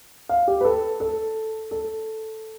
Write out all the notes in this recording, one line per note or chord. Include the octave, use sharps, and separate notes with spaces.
F5
G4
B4
A4
A4
A4